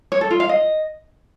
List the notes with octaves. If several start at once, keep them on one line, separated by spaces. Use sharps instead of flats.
C#5
A4
F4
F5
D#5